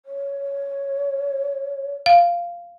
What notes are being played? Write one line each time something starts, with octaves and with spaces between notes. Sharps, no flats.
C#5
F5